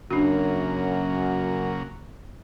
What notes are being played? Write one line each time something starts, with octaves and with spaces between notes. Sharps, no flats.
F#2 C#3 F#3 A#3 D4 F#4